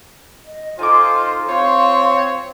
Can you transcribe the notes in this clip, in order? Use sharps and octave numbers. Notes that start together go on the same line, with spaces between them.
D#5
D#4 F4 A4 C5 G#5 C6 D6
C4 F4 C5 C#5 F5 C6